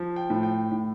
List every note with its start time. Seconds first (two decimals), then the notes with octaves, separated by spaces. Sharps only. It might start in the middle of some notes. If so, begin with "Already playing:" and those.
Already playing: F3
0.16 G5
0.30 A2
0.43 G5
0.71 A2